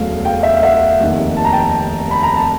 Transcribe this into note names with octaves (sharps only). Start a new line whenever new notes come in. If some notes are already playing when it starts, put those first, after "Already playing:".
Already playing: E1 D2 C#3 F#3 A3 F5
F5 G5
E5
F5
E5 F#5
F1 D#2 D#3
A5
A#5
G5 A5
B5
A#5
A5